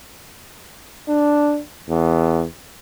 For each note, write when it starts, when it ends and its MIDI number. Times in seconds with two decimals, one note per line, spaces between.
1.08 1.59 62
1.89 2.44 40